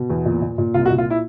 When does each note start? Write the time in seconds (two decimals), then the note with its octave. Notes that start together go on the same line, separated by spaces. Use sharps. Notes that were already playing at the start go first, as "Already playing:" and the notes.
Already playing: B2
0.10 E2
0.25 A#2
0.42 A#2
0.58 A#2
0.74 C2 F4
0.85 F#4
0.90 A#2
0.98 F4
1.10 E4